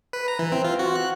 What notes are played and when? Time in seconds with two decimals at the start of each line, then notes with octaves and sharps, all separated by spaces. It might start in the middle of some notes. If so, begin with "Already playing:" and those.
0.13 B4
0.28 A#5
0.39 E3
0.52 C4
0.64 F4
0.79 F#4
0.95 F#6